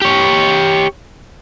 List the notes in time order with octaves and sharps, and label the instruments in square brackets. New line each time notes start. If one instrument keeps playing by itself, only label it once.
[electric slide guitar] G4 C#5